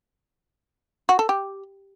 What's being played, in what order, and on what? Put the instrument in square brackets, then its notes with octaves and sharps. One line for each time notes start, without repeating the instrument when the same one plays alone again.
[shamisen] F#4
A4
G4